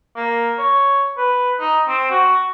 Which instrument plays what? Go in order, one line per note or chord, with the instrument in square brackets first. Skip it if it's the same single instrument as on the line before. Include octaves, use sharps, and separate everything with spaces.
[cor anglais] A#3
C#5
B4
D#4
C4
F#4